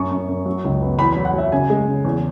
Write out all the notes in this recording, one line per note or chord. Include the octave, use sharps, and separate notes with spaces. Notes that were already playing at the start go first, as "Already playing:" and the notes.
Already playing: F#2 C#6
F#2
F#2
F#3
C#2
B3
E2 B5
F#3 B5
F#5
F#3 E5
C#3 G#5
G#3
C#3
E2